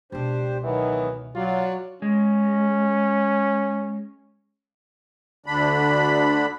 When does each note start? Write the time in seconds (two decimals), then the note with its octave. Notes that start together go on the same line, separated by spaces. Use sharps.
0.12 C#2 B2 D4 G4 C5
0.64 D#3 E3 F#3 B3
1.35 F#3 F4 D5
2.02 G#3 C#4
5.46 D2 D3 D4 B5